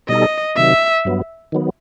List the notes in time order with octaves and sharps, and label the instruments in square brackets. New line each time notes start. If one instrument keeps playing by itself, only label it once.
[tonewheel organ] B2 G3 D#4 A4 [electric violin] D#5
[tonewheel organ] C3 D#3 F#3 [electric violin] E5
[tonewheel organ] G2 F#3 B3
D#3 F#3 B3